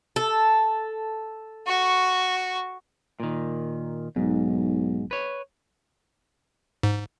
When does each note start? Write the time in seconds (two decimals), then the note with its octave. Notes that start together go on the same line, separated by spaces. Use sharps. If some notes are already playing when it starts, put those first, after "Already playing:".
0.16 A4
1.66 F#4 C#6
3.20 A#2 D#3
4.16 B1 G#2
5.11 B4 C#5
6.83 G#2